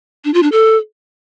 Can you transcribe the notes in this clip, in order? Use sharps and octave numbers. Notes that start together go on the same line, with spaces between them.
D4
F4
D4
A4